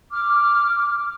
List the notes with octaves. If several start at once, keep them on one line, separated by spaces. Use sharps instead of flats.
D6 F6